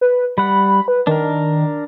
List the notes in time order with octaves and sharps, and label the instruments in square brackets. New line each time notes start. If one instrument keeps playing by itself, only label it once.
[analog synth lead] B4
[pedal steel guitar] G3 F#5 [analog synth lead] B5
[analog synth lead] B4
[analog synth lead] D#3 [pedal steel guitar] D4 A#4